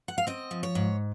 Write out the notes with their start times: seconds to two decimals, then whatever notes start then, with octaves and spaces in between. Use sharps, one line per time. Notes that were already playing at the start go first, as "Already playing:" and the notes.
0.08 F#5
0.18 F5
0.27 C4 D#5
0.51 F3
0.63 C#5
0.75 G#2